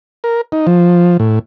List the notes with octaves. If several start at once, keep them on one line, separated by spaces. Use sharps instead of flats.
A#4
D#4
F3
A2